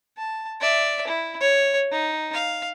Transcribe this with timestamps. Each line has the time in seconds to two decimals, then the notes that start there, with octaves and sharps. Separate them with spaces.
0.17 A5
0.61 D5 E5
1.08 E4
1.41 C#5
1.92 D#4
2.34 F5